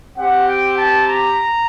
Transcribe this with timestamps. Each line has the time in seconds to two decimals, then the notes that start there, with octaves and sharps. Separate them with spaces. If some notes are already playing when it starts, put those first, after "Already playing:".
0.17 C4 G4 F#5
0.48 G5
0.78 A5
1.08 A#5